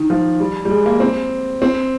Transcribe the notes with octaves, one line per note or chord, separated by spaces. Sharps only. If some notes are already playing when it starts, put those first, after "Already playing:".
Already playing: D#3
F3
G3
G3
G#3
A#3
C4
C4